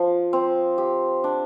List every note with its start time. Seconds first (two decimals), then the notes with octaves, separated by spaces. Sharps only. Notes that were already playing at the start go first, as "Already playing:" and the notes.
Already playing: F3
0.33 C4
0.78 G4
1.24 D4